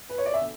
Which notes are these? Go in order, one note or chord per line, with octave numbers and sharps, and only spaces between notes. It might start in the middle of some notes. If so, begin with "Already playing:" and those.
B4
C#5
D5
E5
D3